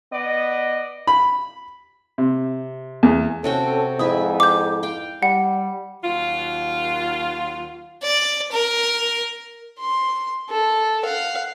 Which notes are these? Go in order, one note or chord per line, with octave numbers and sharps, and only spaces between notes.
B3 D5 D#5
B5
C3
E2
C3 C#4 F#4 A4 G5
F2 G#2 E4 B4 E5 D#6
D6 G6
F5 G5
G3 F#5
D#2 F#3 F4
D5
A#4
C6
A4
F5 F#5